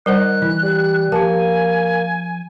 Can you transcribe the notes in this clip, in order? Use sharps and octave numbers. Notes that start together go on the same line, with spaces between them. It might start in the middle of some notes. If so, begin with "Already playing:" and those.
D#3 G3 C5 F#5 F#6
E3 E4
G3
F3 A#3 G4 G#5 A5